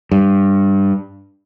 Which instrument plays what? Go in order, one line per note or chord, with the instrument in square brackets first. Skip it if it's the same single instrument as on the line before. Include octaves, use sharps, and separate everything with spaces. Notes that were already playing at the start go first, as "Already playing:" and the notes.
[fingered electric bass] G2